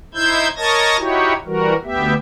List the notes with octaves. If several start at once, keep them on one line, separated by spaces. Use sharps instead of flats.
D#4 E4 C5 E6 G6 G#6
A#4 C#5 D#5 A5 G#6 A#6
D#4 E4 F#4 G4 C#5
E3 G3 F#4 A#4
D2 B3 G4 E5